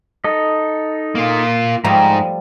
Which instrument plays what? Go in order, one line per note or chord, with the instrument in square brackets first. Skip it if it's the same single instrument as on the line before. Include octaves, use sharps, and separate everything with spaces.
[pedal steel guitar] D#4 A4 D#5
[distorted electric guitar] A#3 F4
[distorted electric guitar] G#2 [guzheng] F3 G3 A3 [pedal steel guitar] A#5